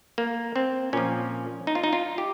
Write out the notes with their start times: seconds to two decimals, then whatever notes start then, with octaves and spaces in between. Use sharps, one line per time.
0.18 A#3
0.56 C4
0.93 A#2 F3 C#4
1.67 D#4
1.75 F4
1.84 D#4
1.93 F4
2.18 G4